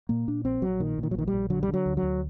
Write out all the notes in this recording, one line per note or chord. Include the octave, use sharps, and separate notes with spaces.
A#2 A#3
A#2 D4
A#1 C4
A#1 F#3
A#2 D#3
A#2 D#3
F#3
A#1 D#3
G3
A#1
D3 F#3
G3
D3
F#3
D2
F#3
D2